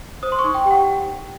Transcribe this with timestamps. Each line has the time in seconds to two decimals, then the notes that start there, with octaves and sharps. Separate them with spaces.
0.23 C5 D#6
0.32 C6
0.39 C#6
0.44 D#4
0.54 G5
0.65 G4 G5
0.71 F#5